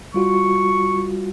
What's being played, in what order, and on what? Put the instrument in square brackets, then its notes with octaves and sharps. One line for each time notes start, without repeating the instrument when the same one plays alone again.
[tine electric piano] G3 F4 F#4 [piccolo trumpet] C#6